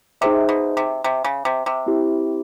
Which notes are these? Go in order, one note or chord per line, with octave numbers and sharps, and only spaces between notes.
C3 D#4 G#4 C5 E5
B2
C3
C3
C#3
C3
C3
C4 E4 G4 C5